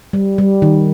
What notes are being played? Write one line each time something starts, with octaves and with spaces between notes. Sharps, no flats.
G3
G3
D#3